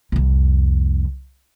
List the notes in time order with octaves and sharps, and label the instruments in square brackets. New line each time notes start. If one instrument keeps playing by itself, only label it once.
[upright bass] C2 F2